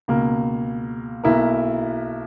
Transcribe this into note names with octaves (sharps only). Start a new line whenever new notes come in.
C#2 B2 A#3
B1 B2 A#3 E4 A#4